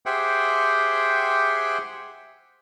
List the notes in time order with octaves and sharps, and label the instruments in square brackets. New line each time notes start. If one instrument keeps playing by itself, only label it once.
[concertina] G4 G#4 C5 E5 F#5 G5